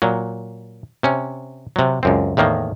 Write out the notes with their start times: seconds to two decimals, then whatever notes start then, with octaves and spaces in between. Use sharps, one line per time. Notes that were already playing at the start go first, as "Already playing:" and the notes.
0.02 A#2 F#3
1.03 C3 C#4
1.76 C3 F#3
2.03 C#2 F#2 C4
2.37 E2 A2 D#3 A#3